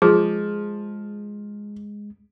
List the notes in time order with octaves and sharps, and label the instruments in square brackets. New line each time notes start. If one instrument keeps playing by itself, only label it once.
[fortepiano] F3 [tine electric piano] G#3 [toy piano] G#4